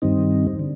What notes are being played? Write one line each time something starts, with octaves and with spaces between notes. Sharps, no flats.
G2 D#3 G3 C4 D#4
D3